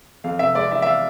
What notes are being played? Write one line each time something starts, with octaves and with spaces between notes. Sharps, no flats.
F2 F5
C3 E5
G#3 D5
E3 E5
E5
F5